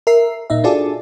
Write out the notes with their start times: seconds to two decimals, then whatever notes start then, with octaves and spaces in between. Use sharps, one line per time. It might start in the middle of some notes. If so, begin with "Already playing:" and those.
0.07 A#4 E5 C7
0.50 A#2 D#4 E5
0.64 D4 F4 F#4 G#4 A4 D5